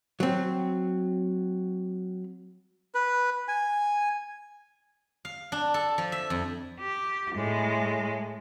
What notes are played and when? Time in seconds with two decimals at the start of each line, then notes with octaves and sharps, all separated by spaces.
0.20 F#3 C4
2.95 B4
3.48 G#5
5.25 F5
5.52 D4
5.74 A4
5.98 F3
6.12 E5
6.30 F2
6.80 G4
7.35 A2 G#3